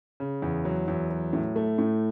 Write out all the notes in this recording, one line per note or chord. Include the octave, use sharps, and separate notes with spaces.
C#3
E2
F#3
E2
F#3
A2
A3
A2